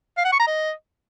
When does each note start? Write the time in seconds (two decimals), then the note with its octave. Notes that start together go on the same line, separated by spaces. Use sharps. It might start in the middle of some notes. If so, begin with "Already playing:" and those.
0.18 F5
0.25 F#5
0.32 C#6
0.40 A#5
0.47 D#5